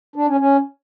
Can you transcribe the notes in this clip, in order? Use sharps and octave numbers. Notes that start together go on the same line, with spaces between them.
D4
C#4
C#4